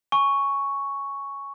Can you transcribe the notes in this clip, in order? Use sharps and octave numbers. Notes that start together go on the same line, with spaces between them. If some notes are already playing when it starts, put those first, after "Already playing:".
G#5 C#6